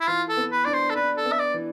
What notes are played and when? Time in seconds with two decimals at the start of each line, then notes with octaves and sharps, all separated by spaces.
0.01 E4
0.07 E3 F4
0.29 A4
0.37 B3
0.52 B4
0.65 D4 D5
0.74 C5
0.90 A4
0.95 D4 B4
1.17 A4
1.25 B3
1.32 E5
1.39 D5
1.54 E3